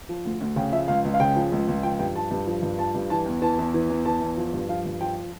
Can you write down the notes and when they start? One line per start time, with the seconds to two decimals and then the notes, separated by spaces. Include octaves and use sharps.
0.09 F3
0.25 D2
0.41 D2
0.56 C#3 G5
0.72 F3 E5
0.88 C#2 F5
1.05 C#2
1.14 F5
1.20 C#3 G5
1.36 F3
1.52 C#2
1.68 C#2
1.83 F3 G5
1.99 G2 G5
2.16 F3 A5
2.31 G2
2.47 F3
2.63 G2
2.79 F3 A5
2.95 G2
3.10 E3 A5
3.26 E2
3.42 E3 A5
3.58 E2
3.74 E3
3.90 E2
4.05 E3 A5
4.21 E2
4.37 F3
4.53 G2
4.69 F3 F5
4.85 G2
5.01 F3 G5